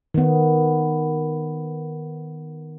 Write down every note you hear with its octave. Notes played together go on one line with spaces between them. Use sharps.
D#3 B3